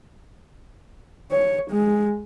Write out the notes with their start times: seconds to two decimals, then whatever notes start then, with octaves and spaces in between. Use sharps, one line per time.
1.32 C#5
1.71 G#3